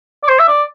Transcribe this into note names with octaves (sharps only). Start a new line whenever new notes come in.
D5
C5
E5
D5